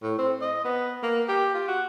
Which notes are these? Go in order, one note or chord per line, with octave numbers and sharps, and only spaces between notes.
A2
C4
D#5
B3
A#3
G4
F4
F#4